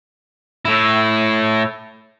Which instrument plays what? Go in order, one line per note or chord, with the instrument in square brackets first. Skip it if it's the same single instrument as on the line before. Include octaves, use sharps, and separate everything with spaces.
[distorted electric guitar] A2 E4